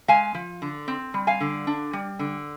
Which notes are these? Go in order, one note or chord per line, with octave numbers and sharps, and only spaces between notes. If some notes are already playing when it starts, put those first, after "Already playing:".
G#3 F5 G#5
F3
D3
C4
G3
F5 G#5
D3
D4
G3
D3